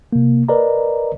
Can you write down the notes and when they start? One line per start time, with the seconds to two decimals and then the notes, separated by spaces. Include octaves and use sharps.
0.13 C3 A#3
0.48 A#4 B4 D5 D#5 A#5